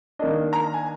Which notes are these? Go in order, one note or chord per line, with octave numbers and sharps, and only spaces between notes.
D#3 A#3 D4 D#5
A#5
G#5